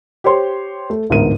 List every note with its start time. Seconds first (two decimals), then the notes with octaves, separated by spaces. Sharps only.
0.24 G4 C5 C#5 C6
0.90 A3
1.10 A1 D2 G#2 B3 A#4 D#7